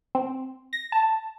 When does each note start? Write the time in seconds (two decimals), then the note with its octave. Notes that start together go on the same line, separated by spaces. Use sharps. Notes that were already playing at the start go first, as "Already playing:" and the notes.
0.15 C4
0.73 A#6
0.92 A5